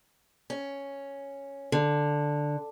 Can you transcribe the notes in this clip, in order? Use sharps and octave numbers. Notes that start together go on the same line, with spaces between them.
C#4
D3